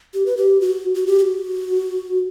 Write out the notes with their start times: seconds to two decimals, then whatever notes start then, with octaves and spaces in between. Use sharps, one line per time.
0.14 G4
0.26 B4
0.37 G4
0.61 F#4
0.95 F#4
1.07 G4
1.19 G4
1.22 F#4